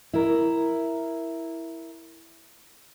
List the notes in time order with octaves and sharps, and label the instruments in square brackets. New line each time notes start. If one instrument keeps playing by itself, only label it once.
[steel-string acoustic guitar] E4 A#4